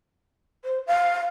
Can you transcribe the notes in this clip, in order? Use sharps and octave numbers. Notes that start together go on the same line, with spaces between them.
C5
F5